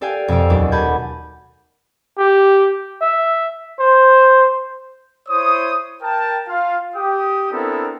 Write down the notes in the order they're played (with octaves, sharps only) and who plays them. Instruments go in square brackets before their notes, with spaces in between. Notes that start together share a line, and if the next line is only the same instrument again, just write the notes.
[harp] G4 A4 D5 F5 G5 G#5
F2 B2 F5 E6 D7
D#1 D#2 F#3 A4 D6
F#5 G#5 A5 B5 G6 G#6
[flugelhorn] G4
E5
C5
[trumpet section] E4 C5 C#5 D#6
A#4 G5 A5
F4 F5
G4 G5 D#6
B3 C4 D4 E4 A4 A#4